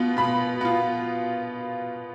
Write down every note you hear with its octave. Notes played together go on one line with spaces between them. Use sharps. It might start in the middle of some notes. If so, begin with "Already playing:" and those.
Already playing: B2 B3 F4
B2 B5
B3 F4